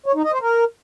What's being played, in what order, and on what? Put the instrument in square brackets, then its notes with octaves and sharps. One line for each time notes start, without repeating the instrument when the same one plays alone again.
[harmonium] C#5
D#4
D#5
C5
A#4